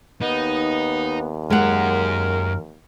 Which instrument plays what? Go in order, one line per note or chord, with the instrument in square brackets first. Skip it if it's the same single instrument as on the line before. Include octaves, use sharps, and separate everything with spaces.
[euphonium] D#2 [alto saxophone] B3 [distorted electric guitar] D#4
[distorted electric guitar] F#2 A#5 [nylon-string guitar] G#3 F#5 [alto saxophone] A#4